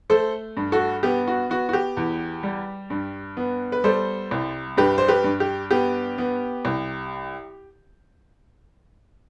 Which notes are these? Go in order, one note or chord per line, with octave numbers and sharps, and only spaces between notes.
A3 A4 C5
G2
F#4 A4
B3 G4
F#4
B3 F#4
F#4
G4
E2
G3
G2
B3
B4
G3 A4 C5
C2
G2 G4 B4
C5
G4 B4
G2
G4
B3 G4
B3
C2